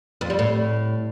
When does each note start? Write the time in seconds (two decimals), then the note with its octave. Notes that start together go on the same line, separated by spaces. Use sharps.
0.21 F2
0.30 G3
0.39 A2